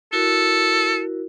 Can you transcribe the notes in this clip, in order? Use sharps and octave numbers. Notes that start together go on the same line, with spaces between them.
E4 F#4 A4 A#4